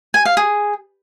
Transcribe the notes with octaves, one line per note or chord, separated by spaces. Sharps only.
G#5
F5
G#4